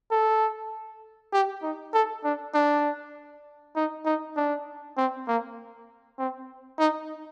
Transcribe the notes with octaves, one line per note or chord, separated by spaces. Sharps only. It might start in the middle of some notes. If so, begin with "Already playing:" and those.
A4
G4
D#4
A4
D4
D4
D#4
D#4
D4
C4
A#3
C4
D#4